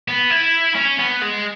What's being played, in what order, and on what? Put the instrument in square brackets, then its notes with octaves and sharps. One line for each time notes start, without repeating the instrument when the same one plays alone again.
[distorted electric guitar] B3
E4
C#4
B3
G#3